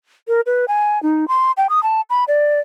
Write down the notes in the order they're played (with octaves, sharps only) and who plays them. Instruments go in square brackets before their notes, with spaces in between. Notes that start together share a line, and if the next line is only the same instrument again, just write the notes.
[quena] A#4
B4
G#5
D#4
C6
G5
D#6
A5
B5
D5